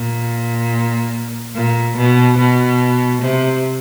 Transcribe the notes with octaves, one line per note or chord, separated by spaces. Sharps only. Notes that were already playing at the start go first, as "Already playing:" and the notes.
Already playing: A#2
A#2
B2
B2
C3